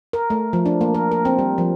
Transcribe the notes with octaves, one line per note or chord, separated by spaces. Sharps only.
A#4
A3
F3
D4
A#3
A#4
A#4
C4
G3
F3